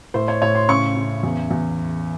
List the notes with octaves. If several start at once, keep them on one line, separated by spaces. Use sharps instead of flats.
A2 C5
C#5
A2 C#5
C6
C#3 C#6
C#3
E2
E2